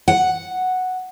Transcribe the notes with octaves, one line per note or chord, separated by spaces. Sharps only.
F#5